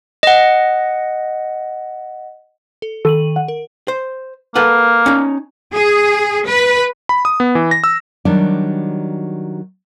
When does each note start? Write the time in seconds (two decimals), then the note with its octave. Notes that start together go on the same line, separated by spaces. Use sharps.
0.23 D#5 F#5
2.82 A4
3.05 D#3 A4 D#7 F#7
3.36 F#5
3.48 A#4
3.88 C5
4.55 A#3 A4 B4 F#5
5.06 C#4 D#4
5.73 G#4
6.47 B4
7.09 B5
7.25 D#6
7.40 B3
7.55 E3
7.71 A#6
7.84 E6
8.25 D#3 F#3 G3 D4